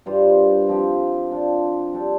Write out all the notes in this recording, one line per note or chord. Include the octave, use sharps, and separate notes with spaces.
G2 G3 F4 C5
F3 C4 G4
F3 D4 F4
G3 D4 A4 C5